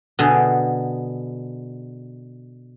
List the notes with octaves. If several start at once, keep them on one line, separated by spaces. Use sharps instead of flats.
B2 D3 G#4